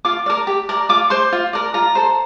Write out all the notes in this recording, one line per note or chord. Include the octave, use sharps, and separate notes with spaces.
F4 D6
A#4 D5
G4
A#4 D5
F4 D6
C5 C6
F4
A#4 D5
F4 A#5
A4 C5